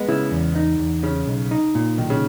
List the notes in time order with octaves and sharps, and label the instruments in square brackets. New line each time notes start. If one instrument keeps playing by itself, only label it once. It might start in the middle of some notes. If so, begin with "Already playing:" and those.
Already playing: [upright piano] G#3 B3
[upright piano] C#3 [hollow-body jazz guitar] E4
[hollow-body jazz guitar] E2
D#4
E2
[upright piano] C#3 [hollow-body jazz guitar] C#4
[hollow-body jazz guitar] B1
D#4
A#2
[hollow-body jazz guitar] B1 [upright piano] D#3
[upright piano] C#3